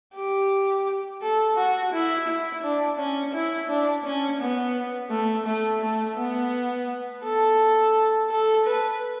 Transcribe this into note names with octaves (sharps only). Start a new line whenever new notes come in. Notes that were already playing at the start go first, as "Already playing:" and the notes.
G4
A4
F#4
E4
E4
D4
C#4
E4
D4
C#4
B3
A3
A3
A3
B3
A4
A4
B4